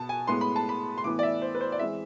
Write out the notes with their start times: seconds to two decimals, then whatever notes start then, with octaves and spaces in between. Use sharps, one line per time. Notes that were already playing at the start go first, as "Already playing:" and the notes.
Already playing: B2 B3 A5
0.09 G#5
0.27 A2 G#3 B3 C6
0.41 B5
0.56 A5
0.69 B5
0.98 C6
1.04 A2 E3 B3 D6
1.19 D5
1.23 E5
1.42 C5
1.55 B4
1.61 C5
1.72 D5
1.79 E3 G#3 C4 E5